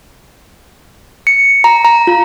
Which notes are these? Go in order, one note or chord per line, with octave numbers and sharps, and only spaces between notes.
C#7
A#5
A#5
F4